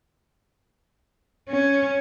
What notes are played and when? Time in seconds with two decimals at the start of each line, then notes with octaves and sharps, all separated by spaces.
1.49 C#4